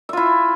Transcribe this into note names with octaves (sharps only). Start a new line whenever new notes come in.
E4 F4 E5